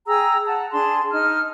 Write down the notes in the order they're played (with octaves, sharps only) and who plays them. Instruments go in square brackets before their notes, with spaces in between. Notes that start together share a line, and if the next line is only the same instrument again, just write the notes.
[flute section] G#4 G5 A#5 E6
F#5 A5
D4 G#4 A5 C6
D#4 F6